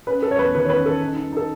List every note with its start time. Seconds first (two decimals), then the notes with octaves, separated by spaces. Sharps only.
0.07 C#4 B4
0.22 C#4 A4
0.31 C#5
0.39 E2 B4
0.55 D#3 B4
0.65 C#5
0.69 C#4 B4
0.85 C#4 A4
1.00 D#4
1.16 D#4
1.32 D#4 A4